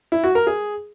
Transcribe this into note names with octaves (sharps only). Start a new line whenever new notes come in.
E4
F#4
A#4
G#4